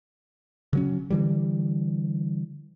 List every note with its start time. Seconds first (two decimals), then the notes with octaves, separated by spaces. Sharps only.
0.73 C#3 F#3 C#4
1.10 D3 E3 G3